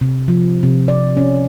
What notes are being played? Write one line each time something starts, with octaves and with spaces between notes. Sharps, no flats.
C3
F3
C3
D5
C#4